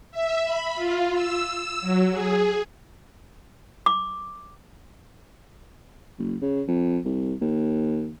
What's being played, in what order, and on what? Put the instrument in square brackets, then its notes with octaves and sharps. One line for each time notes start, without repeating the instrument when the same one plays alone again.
[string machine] E5
B5
F4
E6
E6
F#3
G#4
[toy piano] D6
[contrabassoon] F#1
C#3
F2
C2
D#2